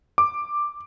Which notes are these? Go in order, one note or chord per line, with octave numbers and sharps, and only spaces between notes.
D6